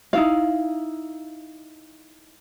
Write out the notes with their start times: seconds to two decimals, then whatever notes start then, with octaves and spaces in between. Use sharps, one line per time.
0.13 D#4 E4 F5